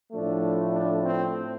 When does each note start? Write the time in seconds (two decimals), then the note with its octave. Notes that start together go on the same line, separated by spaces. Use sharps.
0.13 A2 F3 A3 D4
0.72 D4
1.01 C4